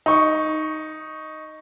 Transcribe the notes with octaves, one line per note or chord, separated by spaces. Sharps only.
D#4 C#6